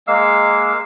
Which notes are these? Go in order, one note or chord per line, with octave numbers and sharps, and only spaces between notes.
G#3 A#3 F5 E6